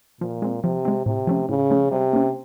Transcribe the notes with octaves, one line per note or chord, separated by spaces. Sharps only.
A#2 F3
G#3 C4
C3 F3
G#3 C4
A2 C3
F3 A3 C#4
A2 C#3
F3 A3 C#4
C3 G3
A#3 C#4